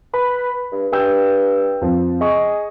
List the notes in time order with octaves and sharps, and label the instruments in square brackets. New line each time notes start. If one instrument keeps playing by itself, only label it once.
[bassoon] B4 [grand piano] B5
[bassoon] G2
[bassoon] G2 [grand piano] G5 E6 G6
[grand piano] F2 F3 C4
[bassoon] G#4 [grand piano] D#5 C#6